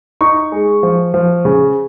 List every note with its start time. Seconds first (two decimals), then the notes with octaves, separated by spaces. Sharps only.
0.21 D#4 C#6
0.52 G#3
0.83 F3
1.14 F3
1.45 C#3